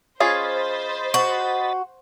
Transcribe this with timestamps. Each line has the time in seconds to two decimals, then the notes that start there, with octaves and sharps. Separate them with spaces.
0.20 C#4 F4 G#4 C5 D#5 B5 A6
1.14 F#4